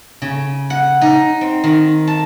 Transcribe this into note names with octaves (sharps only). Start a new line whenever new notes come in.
C#3
F#5
D#4
C4
D#3
A5